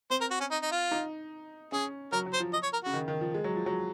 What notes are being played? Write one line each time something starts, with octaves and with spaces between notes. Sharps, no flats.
C4 C5
A#4
F#4
C#4
D#4
D#4
F4
D#4
C#4 G#4
F#3 A#4
F#3
C5
F3
D#5
C#5
A#4
C#3 F#4
D#3
D#3
F3
G#3
F#3
F3
F#3